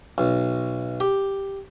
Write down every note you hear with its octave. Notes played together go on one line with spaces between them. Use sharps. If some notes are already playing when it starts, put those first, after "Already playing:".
B1
G4